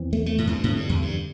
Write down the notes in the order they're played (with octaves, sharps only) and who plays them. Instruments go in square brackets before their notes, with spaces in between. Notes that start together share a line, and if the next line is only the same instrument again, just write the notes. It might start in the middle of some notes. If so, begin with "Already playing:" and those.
Already playing: [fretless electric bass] E2 E3 C4
[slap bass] A3
A3
A2
E2
G2
[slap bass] A2 [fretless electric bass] D3 C4
[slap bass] G2
E2
G2